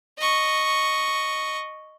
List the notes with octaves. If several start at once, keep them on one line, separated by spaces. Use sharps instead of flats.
D#5 C#6